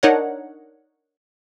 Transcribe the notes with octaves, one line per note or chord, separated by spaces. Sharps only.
D4 D#4 A#4 C#5 F#5